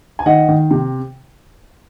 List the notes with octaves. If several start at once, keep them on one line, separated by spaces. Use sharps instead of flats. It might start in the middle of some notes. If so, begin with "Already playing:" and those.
G#5
D#3 D#5 F#5
D#3
C3